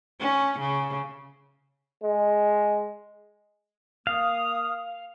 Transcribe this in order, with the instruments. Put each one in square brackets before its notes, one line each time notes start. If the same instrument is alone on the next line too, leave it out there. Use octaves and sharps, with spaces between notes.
[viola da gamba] C#4
C#3
[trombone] G#3
[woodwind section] A#3 D#6 [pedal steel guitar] F5